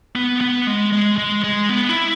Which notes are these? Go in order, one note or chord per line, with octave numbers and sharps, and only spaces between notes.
B3
B3
G#3
G#3
G#3
G#3
B3
E4